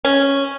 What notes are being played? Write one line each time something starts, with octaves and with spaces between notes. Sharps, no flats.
C#4